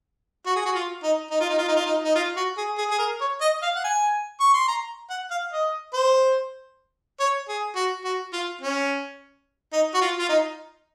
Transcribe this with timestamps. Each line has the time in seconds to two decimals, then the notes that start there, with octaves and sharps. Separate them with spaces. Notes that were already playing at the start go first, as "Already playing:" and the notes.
0.46 F#4
0.56 G#4
0.65 F#4
0.75 F4
1.03 D#4
1.31 D#4
1.41 F4
1.49 D#4
1.58 F4
1.68 D#4
1.76 F4
1.86 D#4
2.04 D#4
2.15 F4
2.37 F#4
2.57 G#4
2.78 G#4
2.91 G#4
2.99 A#4
3.21 C#5
3.41 D#5
3.62 F5
3.75 F#5
3.84 G#5
4.40 C#6
4.54 C6
4.68 A#5
5.10 F#5
5.30 F5
5.52 D#5
5.93 C5
7.20 C#5
7.49 G#4
7.76 F#4
8.04 F#4
8.33 F4
8.61 C#4
9.73 D#4
9.94 F#4
10.01 F4
10.18 F4
10.29 D#4